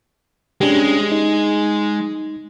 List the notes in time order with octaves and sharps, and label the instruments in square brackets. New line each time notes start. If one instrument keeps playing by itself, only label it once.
[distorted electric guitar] G#3 [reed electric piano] C#4 D4 G4
[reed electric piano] D#4